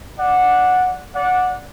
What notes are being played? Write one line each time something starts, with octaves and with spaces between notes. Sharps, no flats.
D5 F#5
D5 F#5